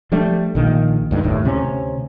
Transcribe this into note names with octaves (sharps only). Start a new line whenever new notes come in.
F3 G3 A3 D4
A#1 D#3 A#3
D2 G2 D#3
G1 D#2 A2
D2 C3 A#3 C#4